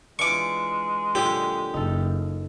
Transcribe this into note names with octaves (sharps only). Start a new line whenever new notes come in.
E3 G#3 D4 F4 C#6 D6
A#2 D3 F#3 G4
F#1 D#4 A4